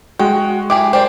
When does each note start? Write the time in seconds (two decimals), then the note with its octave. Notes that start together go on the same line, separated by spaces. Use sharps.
0.19 G#3 F#4 G5
0.70 E4 G4 G#4 D6
0.93 G4 A#4 C5 D5